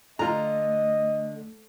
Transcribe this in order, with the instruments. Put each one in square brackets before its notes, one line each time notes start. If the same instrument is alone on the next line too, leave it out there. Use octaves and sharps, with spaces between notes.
[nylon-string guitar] D3 [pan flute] A3 [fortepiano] F4 A#5 [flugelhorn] D#5